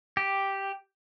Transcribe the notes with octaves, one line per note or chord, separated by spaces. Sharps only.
G4